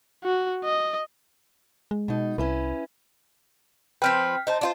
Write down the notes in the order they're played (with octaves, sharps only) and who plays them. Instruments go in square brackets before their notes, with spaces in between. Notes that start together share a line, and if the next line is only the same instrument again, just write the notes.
[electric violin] F#4
D#5
[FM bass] G#3
[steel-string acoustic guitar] B2 D#4
[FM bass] C2 [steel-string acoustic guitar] C#4 E4 B4
[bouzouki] F3 C4 B4 [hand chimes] G5 F6 B6
[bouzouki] D#4 C5 [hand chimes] D#5 A5
[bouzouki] D4 F4 C5